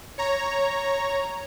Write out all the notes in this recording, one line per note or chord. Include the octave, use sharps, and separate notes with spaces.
C#5 A#5